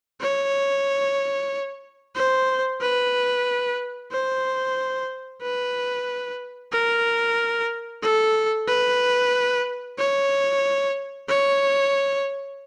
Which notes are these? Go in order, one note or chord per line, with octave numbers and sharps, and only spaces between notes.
C#5
C5
B4
C5
B4
A#4
A4
B4
C#5
C#5